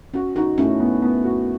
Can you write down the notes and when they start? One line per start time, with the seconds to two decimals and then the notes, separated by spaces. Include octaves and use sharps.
0.14 C#4 F#4
0.35 D#4 F#4
0.58 A2 C#4
0.80 B3
1.02 B3
1.24 F#4